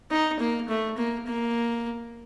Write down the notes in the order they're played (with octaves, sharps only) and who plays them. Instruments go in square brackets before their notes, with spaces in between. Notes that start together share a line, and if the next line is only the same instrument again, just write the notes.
[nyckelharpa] D#4
A#3
A3
A#3
A#3